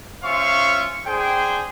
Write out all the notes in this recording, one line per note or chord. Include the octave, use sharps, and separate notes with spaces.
C#4 F4 C5 E5 F5 C#6
D4 G#4 C5 G5